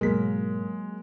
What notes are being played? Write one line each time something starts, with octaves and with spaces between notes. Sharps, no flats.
G#2 B2 F#3 G#3 A#3 A#4 B6